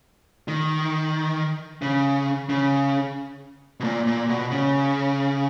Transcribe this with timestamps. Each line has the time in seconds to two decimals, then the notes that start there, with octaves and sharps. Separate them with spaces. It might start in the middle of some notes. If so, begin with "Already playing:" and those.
0.48 D#3
1.82 C#3
2.49 C#3
3.80 B2
3.84 A#2
4.07 A#2
4.29 B2
4.51 C#3